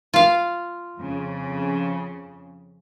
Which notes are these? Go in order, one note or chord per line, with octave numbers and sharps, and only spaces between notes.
F4 F5
F2 C#3